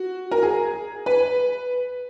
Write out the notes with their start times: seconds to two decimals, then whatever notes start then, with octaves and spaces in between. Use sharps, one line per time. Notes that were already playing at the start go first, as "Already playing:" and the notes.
Already playing: F#4
0.31 A#4
0.43 G#4
1.06 B4